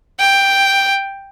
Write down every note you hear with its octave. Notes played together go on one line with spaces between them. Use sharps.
G5